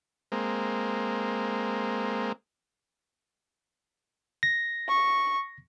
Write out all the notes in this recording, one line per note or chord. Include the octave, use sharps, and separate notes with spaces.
G#3 A#3 C4
A#6
C#6